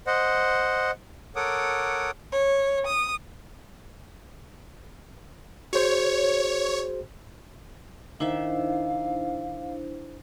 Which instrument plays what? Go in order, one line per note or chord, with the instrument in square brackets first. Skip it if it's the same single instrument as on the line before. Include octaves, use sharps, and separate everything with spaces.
[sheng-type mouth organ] C5 D#5 F#5
A4 A#4 C#5 F#5 D6 D#6
[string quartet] C#5
D#6
[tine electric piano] F#4 G#4 C5 [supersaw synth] C#5
[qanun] D#3 E5 [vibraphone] D4 E4 C5 [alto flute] F5